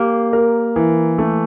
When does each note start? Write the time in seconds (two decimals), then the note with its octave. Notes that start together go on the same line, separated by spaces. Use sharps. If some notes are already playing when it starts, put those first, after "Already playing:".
Already playing: A#3 G4
0.33 A#4
0.76 E3
1.18 A3